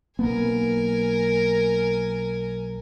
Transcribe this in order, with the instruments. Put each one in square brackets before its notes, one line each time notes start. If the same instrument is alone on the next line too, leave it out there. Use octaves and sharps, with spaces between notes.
[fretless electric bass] B1 A#3 B3 [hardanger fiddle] A#4 G#5